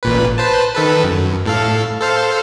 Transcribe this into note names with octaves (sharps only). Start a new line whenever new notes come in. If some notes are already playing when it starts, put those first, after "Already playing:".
A1 A#2 B4
B4 C5 A5
D#3 A4 B4
F#2
A2 A4 F5
A4 C5 F5